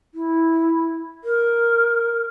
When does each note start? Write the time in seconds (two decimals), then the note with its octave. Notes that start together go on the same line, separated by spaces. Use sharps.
0.14 E4
1.24 A#4